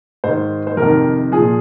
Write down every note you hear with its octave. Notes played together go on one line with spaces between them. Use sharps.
G#2 D#3 C5
C5
F2 C3 D#3 A#4
A#2 F3 G#4